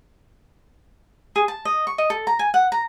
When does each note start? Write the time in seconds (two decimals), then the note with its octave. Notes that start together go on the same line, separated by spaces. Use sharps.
1.36 G#4
1.48 A5
1.65 D#5
1.87 C#6
1.98 D#5
2.10 A4
2.27 A#5
2.39 G#5
2.54 F#5
2.72 A#5